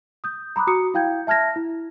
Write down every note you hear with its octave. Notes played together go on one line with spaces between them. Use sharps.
D#6 G6
A#5 B5 D6 D#6 F#6
F#4 A#5 D#6 C#7
E4 F5 G5 G6 G#6
E5 A5 F6 G#6 A#6
E4